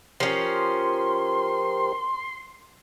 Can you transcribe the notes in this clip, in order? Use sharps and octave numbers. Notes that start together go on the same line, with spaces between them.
F3 C#4 G4 A#4 C5 C6